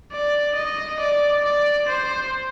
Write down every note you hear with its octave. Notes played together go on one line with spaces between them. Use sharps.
D5
D#5
D5
D5
C5